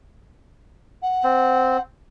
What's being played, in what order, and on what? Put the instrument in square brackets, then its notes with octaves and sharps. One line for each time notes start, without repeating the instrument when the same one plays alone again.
[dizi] F#5
[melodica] C4